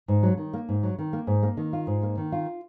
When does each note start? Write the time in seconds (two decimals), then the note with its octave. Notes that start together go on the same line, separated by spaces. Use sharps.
0.08 G#2
0.23 F#3
0.37 D#3
0.53 A#3
0.69 G#2
0.83 F#3
0.98 D#3
1.13 A#3
1.27 G#2
1.43 A#3
1.57 D#3
1.73 F4
1.87 G#2
2.03 A#3
2.17 D#3
2.32 F4